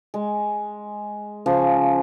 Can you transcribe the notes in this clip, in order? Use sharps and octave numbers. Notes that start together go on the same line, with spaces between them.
G#3
C#3 F3